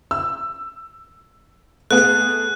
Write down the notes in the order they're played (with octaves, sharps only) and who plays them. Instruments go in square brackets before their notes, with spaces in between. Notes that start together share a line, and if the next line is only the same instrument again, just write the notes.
[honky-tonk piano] E6
[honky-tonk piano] A3 B3 G#4 [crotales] F#6